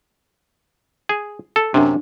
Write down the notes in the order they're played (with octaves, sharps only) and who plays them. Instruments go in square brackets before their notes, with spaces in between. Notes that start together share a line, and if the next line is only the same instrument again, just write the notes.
[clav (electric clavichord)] G#4
A4
[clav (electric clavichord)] F#2 C3 [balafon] D4